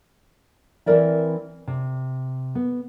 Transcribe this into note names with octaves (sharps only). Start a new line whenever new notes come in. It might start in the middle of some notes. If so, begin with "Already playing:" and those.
E3 C4 E4 A#4 D5 E5
C3
B3